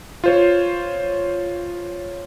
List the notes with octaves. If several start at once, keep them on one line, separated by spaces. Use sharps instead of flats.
F4 C5 C#5